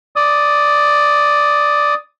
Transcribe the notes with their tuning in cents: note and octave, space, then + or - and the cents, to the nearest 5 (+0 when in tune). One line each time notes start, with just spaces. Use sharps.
D5 +0 D#6 +0